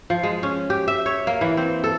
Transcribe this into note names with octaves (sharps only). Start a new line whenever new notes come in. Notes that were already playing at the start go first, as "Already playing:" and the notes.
F3
G#3
C#4
G4
E5
C#5
A#3
E3
C4
A4